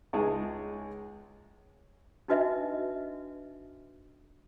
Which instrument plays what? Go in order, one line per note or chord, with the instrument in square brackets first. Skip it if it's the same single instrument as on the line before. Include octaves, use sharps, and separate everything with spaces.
[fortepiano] C#2 G#3 D#4 G#4 A5
[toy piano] D4 D#4 F#4 B4 D#5 E5